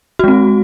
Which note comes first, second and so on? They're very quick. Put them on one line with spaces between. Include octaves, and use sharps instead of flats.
F#4 G#3 C4